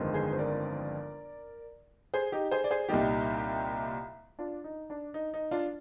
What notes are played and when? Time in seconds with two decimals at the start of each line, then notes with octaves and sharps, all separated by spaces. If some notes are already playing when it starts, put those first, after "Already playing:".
Already playing: G1 F2 D#3 G#3 C4
0.14 G#4 C5
0.33 C5
0.39 A#4 D5
2.14 G#4 C5
2.32 D#4 G4
2.51 G#4 C5
2.64 D5
2.71 G#4 C5
2.89 C2 A#2 G3 D#4 G4
4.39 D4 F4
4.64 D#4
4.90 D4
5.14 D#4
5.34 D#4
5.51 D4 F4